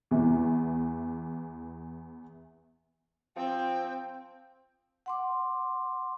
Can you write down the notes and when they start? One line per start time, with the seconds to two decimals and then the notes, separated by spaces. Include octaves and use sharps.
0.11 E2 E3
3.37 F3 C4 G5
5.06 F#5 C6 D6